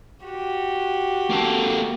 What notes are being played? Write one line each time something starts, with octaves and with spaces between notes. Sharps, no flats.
F#4 G4
A#3 A4